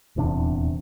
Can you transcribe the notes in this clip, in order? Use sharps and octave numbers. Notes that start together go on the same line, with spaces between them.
D#1 E2 C3 D4